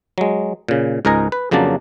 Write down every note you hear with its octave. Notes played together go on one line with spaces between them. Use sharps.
F#3 G#3
A#2 C#3
C#2 G#2 A#4 D#5 G#5 A#5
B4
F2 C#3 F#3 A#3 D4 A5